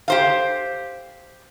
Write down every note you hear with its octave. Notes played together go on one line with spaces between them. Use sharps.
G4 C5 F5